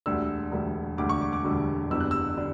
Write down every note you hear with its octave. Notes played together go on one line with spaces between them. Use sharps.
E1 D2 D3 G3 E6
E1 D2 D3 G3
E1 D2 D3 G3 D6
C#6
D6
D6
E1 D2 D3 G3
F#1 E2 D3 G3 E6
F#6
E6
D3 G3